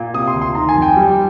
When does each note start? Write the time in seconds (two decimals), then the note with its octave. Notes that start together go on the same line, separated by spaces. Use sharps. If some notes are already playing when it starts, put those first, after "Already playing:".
Already playing: A#2
0.14 C3 D#6
0.28 C6
0.34 D2
0.42 C6
0.55 D#3 A#5
0.69 G#5
0.75 F2
0.82 G5
0.97 G3